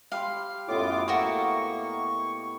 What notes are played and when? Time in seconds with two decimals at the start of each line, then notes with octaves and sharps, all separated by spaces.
0.12 G4 F5 B5 C6
0.68 F#2 A2 B3 F4 D#5 D6
1.08 A#3 F#4 E5 G5 C#6